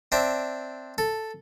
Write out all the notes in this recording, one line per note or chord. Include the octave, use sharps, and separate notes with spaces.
C4 D4 E5
A4